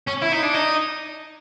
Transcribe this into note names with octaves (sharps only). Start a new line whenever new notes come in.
C#4
E4
D#4
D4
D#4